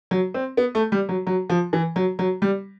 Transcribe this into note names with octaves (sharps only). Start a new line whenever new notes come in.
F#3
C4
B3
A3
G3
F#3
F#3
F3
E3
F#3
F#3
G3